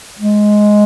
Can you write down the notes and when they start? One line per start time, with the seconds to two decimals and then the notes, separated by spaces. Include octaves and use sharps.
0.19 G#3